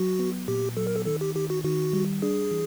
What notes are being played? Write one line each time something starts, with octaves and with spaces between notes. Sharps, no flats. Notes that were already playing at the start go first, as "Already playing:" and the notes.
Already playing: F#3 F#4
B3
A#2 G4
F#3 A4
A#4
A4
D#3 A4
G4
D#3 G4
F#4
D#3 F#4
G3
D4 G#4
E3